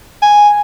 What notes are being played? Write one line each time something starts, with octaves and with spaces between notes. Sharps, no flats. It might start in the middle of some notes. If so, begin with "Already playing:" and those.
G#5